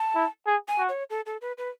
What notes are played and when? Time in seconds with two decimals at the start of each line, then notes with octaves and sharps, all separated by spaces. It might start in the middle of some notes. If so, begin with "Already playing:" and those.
Already playing: A5
0.15 E4
0.47 G#4
0.68 G#5
0.79 F#4
0.89 C#5
1.10 A4
1.26 A4
1.41 B4
1.58 B4